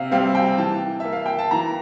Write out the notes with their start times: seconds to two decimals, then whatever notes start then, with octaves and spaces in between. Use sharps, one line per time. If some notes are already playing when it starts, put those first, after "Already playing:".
Already playing: C3 F5
0.11 G3 C4 F5
0.35 G5
0.58 E3 A5
1.00 A#3 E5
1.13 F5
1.26 G5
1.38 A5
1.51 E3 A#5